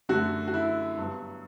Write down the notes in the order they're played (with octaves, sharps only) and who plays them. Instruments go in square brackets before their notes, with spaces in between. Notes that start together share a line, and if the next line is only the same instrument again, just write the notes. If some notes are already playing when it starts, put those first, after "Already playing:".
[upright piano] F#2 D3 A3 F#4
F#4
E4
G2 F#3 B3